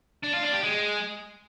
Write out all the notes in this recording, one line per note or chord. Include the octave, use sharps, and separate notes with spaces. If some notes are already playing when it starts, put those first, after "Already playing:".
D4
F4
D4
G4
G#3